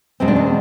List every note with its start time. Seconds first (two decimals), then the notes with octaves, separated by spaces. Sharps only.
0.20 E2 B2 G#3 C4
0.28 D4
0.36 C4